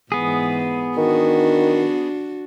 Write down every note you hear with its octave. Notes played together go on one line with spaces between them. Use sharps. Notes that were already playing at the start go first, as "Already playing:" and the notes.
G#2 E3 B3 G#4
D#3 D4 F#4